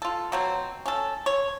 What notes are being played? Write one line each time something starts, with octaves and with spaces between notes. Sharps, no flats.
F4 A4
B2 F#3 C4
C#4 A4
C#5